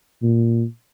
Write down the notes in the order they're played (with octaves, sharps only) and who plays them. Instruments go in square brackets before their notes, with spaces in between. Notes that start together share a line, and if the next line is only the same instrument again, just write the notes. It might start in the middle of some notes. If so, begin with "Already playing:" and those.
[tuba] A#2